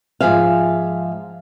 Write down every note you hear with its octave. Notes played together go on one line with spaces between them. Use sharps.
G#2 F3 G#4 E5 F5